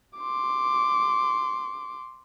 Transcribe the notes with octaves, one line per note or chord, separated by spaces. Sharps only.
C6 D6